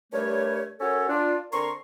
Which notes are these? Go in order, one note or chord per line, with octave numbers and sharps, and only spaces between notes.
G2 G3 A3 A#4 C#5
C#4 F#4 A4 A#4 C#5
D4 F4
D3 C4 A#4 A#5 C6 C#6